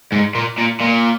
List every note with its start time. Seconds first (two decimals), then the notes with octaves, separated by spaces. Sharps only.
0.12 G#2
0.35 A#2
0.58 A#2
0.81 A#2